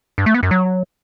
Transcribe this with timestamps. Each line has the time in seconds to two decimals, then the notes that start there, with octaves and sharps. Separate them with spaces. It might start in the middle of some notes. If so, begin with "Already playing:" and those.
0.18 G2
0.26 A3
0.34 B3
0.43 F#2
0.51 F#3